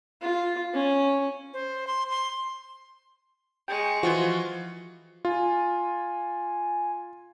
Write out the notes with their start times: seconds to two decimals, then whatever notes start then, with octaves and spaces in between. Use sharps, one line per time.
0.22 F4
0.74 C#4
1.53 C5
1.87 C6
2.11 C6
3.68 G#3 G5 C#6
4.03 E3 F3 F4 F#4
5.25 F4 G#5